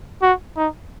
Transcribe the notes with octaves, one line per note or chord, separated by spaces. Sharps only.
F#4
D#4